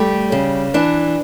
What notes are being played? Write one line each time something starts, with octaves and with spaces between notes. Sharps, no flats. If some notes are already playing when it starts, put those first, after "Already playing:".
Already playing: G3 A3 G4
C#3
E3 D4